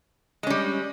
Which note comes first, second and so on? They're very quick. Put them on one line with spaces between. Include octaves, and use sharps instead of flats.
G#3 C#4 G3